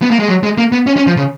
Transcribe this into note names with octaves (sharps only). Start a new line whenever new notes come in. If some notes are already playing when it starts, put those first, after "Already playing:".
B3
A#3
G#3
F#3
G#3
A#3
B3
C#4
C#4
F3
C#3